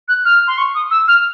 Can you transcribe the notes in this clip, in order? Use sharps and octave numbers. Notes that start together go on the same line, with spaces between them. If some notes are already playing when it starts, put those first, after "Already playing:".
F#6
F6
C6
C#6
D#6
E6
F6